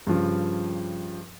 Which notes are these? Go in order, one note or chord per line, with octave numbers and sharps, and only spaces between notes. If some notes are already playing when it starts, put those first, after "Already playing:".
G2 C#3 F3